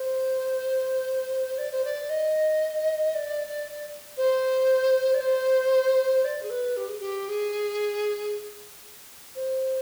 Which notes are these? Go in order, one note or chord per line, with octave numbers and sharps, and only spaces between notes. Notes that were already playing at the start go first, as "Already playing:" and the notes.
Already playing: C5
D5
C5
D5
D#5
D5
C5
D5
C5
D5
G#4
B4
G4
G#4
G4
G#4
C5